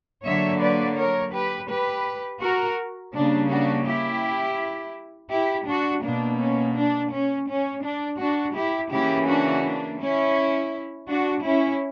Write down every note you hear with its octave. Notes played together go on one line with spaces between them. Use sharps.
D3 F#3 A#3 C#5 E5
B4 D5
A#4 C#5
G4 B4
G4 B4
F#4 A#4
C#3 G3 A#3 D4
D4 F#4
E4 G4
E4 G4
D4 F#4
B2 A#3 D4
C#4
D4
C#4
C#4
D4
D4 F#4
E4 G4
C#3 E3 A#3 E4 G4
D4 F#4
D4
C#4 E4
D4 F#4
C#4 E4